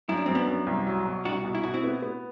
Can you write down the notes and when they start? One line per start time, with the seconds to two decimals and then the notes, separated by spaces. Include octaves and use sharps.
0.08 F#2 E4
0.17 D4
0.26 F#2 C4
0.35 B3 D4
0.47 F#2
0.67 C2
0.87 F#3
1.06 B2
1.25 C2 D4 F#4
1.45 B2
1.55 E4
1.64 B2 F#4
1.74 C4 E4
1.84 B3
2.02 B3